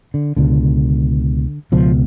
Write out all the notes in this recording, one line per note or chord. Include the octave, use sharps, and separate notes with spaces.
D3
C#2 B2 D3
C#2 B2 F3